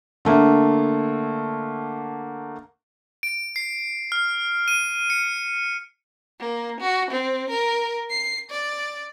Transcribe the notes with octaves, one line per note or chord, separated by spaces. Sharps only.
D3 A3 A#3
D7
C7
F6
D#7
C#7
A#3
F#4
C4
A#4
C7
D5